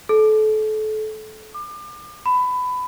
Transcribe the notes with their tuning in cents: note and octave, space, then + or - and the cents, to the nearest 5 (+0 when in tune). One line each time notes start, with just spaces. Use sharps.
A4 -30
D6 +35
B5 +20